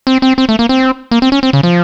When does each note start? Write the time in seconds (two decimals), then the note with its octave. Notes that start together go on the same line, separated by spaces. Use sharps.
0.07 C4
0.22 C4
0.38 C4
0.49 A3
0.59 A#3
0.69 C4
1.11 A#3
1.22 C4
1.32 C#4
1.43 C4
1.53 C#3
1.63 F3